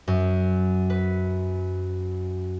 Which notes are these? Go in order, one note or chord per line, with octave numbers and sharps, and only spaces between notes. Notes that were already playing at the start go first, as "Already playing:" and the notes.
F#2
B4